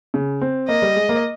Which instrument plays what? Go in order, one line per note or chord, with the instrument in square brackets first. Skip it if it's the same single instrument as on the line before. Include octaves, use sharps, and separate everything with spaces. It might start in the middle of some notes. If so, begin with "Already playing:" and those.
[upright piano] C#3
C4
[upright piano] A#3 [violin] D#5
[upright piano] G3
G#3
A#3